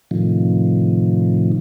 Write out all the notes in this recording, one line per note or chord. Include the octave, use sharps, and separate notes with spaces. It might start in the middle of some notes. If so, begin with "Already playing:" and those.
A2 C3 D#3 F3